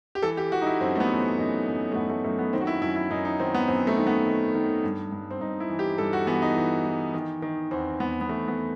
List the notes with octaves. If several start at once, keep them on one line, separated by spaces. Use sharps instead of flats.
G4
E3 A4
G4
E3 F#4
D#4
E4
F#2 C4
A3
B3
E3
C4
F#2 D#4
F#2
A3
F#2 B3
A3
F#2 A3
B3
D#3 C4
F#4
E4
F#2 E4
E4
F#2 D#4
D#4
D#3 C4
B3
F#2 C4
A3
D#3
B3
D#3
D#3
G2
G2
C4
G2 D#4
E4
E3
G4
G2 A4
F#4
E3 B3
D#4
E3
E3
D#3
D#3
E2 C4
E2 B3
B3
E2 A3
B3